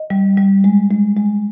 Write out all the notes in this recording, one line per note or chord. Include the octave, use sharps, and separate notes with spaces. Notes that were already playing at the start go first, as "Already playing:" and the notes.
Already playing: D#5
G3
G3
G#3
G#3
G#3